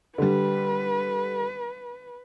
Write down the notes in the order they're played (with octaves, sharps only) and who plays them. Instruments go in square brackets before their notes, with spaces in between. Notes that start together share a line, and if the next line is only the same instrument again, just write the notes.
[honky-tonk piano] D3 G3 [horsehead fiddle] B4